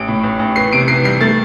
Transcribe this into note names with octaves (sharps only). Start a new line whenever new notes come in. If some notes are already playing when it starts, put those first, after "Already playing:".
Already playing: A1 D7
A2
A1
A1
E3 C7
C3 D7
E3 C7
G3 C7
A3 A6